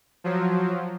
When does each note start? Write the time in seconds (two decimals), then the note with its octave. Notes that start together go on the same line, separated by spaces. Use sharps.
0.24 F3 F#3